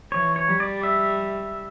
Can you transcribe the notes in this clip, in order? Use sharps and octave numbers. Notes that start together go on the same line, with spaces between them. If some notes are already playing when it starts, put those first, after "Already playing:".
E3 C#5
C#5
G3
D5
E5